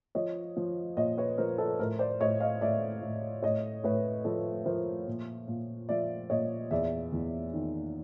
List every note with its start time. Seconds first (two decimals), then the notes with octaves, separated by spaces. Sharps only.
0.15 F3 C#5 D#5
0.57 F3
0.97 A#2 C#5 D#5
1.17 B4 C#5
1.38 F3 A#4 C5
1.58 A4 B4
1.79 A2 A#4 C5
1.99 C5 D5
2.20 A2 C#5 D#5
2.40 D#5 F5
2.61 A2 D5 E5
3.01 A2
3.43 A2 C#5 D#5
3.84 A2 B4 C#5
4.25 F3 A4 B4
4.66 F3 A#4 C5
5.07 A#2
5.48 A#2
5.89 F3 D5 E5
6.30 A#2 C#5 D#5
6.71 E2 D5 E5
7.12 E2
7.53 D#3